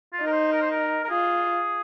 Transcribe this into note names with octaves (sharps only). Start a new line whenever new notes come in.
F4
D#4 A#4
C5
A#4
C5
A#4
A#4
F4 G#4